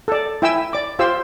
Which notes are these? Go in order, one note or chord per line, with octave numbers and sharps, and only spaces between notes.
A4 D5
E4 E5 G5 G#5 E6
D5 D6
F4 G4 C5 F5 E6